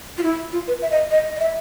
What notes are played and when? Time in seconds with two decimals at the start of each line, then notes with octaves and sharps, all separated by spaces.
0.18 F4
0.23 E4
0.52 F4
0.68 B4
0.82 E5
0.91 D#5
1.11 D#5
1.36 D#5
1.40 E5